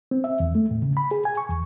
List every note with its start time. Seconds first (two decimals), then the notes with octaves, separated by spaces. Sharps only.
0.11 C4
0.24 E5
0.40 E2
0.55 A3
0.71 A2
0.82 C#3
0.97 B5
1.11 G#4
1.25 G#5
1.37 C#6
1.50 E2